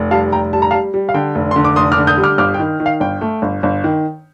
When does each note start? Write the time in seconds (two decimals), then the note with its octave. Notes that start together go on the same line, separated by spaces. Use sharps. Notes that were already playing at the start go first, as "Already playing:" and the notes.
Already playing: F1
0.11 G3 F5 A5
0.32 F1 G5 A#5
0.53 G3 A5
0.62 A#5
0.71 G3 F5 A5
0.94 G3
1.09 F5
1.14 D3 G5
1.35 F1
1.51 D3 C6
1.65 D6
1.76 F1 C6 D#6
1.92 D6 F6
1.98 D3
2.07 D#6 G6
2.18 G3
2.23 D6 F6
2.38 G1 D6 F6
2.54 G5
2.60 D#3
2.80 D#3
2.86 F5
3.00 G1 G5
3.21 A3
3.42 G1
3.63 G1
3.84 D#3